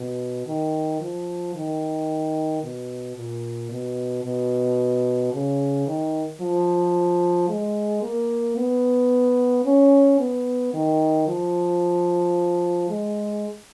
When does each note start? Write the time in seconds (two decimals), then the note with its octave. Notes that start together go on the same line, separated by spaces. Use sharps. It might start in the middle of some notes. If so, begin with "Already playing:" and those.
Already playing: B2
0.46 D#3
1.01 F3
1.55 D#3
2.63 B2
3.17 A#2
3.71 B2
4.24 B2
5.33 C#3
5.87 D#3
6.41 F3
7.49 G#3
8.02 A#3
8.57 B3
9.65 C#4
10.20 B3
10.74 D#3
11.28 F3
12.90 G#3